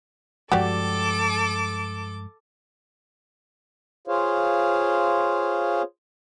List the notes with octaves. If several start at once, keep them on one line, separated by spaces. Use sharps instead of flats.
G2 F3 G#3 F#4 G4 A4 D5 D6
F4 G#4 C5 C#5 F5